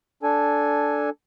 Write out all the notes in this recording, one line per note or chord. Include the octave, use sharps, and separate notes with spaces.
D4 A4 G#5